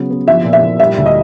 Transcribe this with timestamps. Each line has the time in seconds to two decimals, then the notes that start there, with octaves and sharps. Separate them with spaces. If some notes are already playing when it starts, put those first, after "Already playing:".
Already playing: C#3 F#3 B3
0.10 B3
0.27 F3 E5
0.45 A#2
0.53 E5
0.62 A#2
0.80 G3 E5
0.98 D2
1.06 D#5